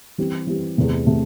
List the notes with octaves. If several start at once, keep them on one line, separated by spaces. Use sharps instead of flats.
E3 G3 C4 G4
E3 G3 C4 G4
E2 C3 A3
C3 A3